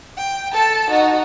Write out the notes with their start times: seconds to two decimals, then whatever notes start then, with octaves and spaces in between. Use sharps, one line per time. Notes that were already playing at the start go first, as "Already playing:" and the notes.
0.18 G5
0.53 A4 A5
0.90 D#4 F#4